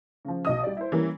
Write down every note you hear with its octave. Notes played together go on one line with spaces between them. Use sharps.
C#3 F3
B1 D#5 D#6
G3 D5
E4 C5
E3 G3 A#3 C#4